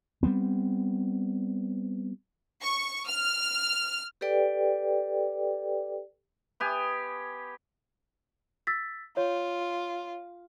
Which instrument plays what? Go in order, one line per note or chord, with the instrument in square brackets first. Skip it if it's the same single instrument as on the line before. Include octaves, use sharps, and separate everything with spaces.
[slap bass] G3 G#3 B3 C4
[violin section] C#6
F6
[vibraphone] G4 A4 B4 D5 G5
[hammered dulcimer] B3 G4 G#5
[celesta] E6 A6 B6
[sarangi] F4 [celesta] C#5